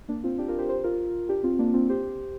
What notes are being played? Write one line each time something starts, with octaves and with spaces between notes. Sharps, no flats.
A#3 D4
C4 F4
D4 G4
F4 A#4
G4 C5
G4 C5
F4 A#4
D4 G4
C4 F4
A#3 D4
C4 F4
G4 C5